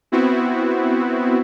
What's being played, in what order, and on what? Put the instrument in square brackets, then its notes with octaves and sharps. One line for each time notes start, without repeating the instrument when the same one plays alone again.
[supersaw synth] B3 C4 E4 F#4